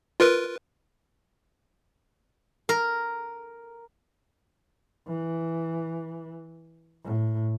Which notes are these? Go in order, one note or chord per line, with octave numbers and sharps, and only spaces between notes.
F4 A#4 B4
A#4
E3
A2